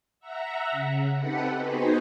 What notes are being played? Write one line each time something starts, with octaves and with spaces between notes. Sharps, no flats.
E5 F#5 A#5
C#3
C4 D#4 G4 A4 B4 F#5
B3 D#4 F#4 G#4 B4 C5